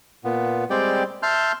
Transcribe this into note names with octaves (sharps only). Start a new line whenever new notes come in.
A#2 B3
G3 G#3 C4 G4 D5 G5
E5 A5 C6 F6 G6